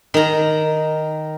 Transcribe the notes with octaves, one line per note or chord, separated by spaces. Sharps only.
D#3 A#5